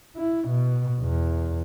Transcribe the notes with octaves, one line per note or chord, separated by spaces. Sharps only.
E4
B2
E2